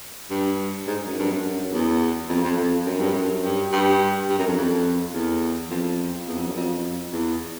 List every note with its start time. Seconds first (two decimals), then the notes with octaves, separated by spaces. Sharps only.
0.30 G2
0.87 G#2
1.06 F#2
1.19 G2
1.32 F#2
1.73 E2
2.29 F2
2.44 F2
2.58 F2
2.87 F#2
3.00 G2
3.13 F#2
3.43 G2
3.72 G2
4.29 G2
4.38 F#2
4.47 F2
4.57 F2
5.14 E2
5.70 F2
6.28 E2
6.37 F2
6.46 F#2
6.56 F2
7.13 E2